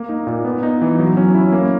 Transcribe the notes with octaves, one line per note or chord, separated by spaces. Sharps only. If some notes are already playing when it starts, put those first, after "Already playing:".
Already playing: A#3
D#4
A#2
B3
D#4
E3
F#3
C#4
E4
A#3